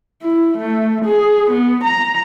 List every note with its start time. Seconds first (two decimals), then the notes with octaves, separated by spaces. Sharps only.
0.22 E4
0.58 A3
1.05 G#4
1.50 B3
1.84 A#5